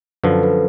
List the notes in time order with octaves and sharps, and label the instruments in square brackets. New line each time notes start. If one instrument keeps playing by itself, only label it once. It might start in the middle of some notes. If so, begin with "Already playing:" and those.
[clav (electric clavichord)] F#2 D3 F3 [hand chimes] A4 B4
[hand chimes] A4 B4